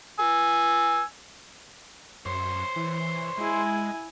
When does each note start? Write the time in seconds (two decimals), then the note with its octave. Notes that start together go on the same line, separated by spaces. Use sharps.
0.19 G#5 E6
2.26 F#2 C5 C#5
2.76 E3
3.38 G#3 E4 G#5